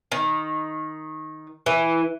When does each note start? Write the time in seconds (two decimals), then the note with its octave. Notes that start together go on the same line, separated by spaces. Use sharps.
0.12 D#3
1.66 E3